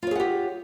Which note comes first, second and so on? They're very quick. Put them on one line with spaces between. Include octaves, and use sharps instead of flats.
F4 C#5 G#4 F#5 G4